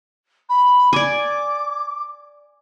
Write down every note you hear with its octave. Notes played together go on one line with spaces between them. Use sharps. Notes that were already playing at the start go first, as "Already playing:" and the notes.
B5
D5 G#5 D6